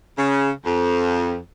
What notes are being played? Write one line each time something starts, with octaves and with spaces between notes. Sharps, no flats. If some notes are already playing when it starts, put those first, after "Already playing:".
C#3
F2